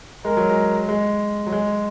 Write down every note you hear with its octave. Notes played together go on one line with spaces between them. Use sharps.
G#3 A#4
F#3
G#3
G#3
F#3
G#3